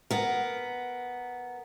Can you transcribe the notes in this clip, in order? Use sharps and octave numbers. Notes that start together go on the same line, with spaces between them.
B3 A#4